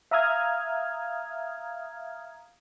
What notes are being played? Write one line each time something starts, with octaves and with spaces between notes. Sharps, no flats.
E5 F5 A#5 D#6 F6 G#6